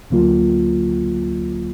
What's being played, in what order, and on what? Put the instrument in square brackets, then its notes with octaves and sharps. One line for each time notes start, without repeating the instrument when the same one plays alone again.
[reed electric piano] D2 D3 F#3 A#3 F4